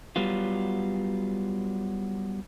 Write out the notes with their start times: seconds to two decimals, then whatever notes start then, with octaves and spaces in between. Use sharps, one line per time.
0.16 F#3 G3 B3 F4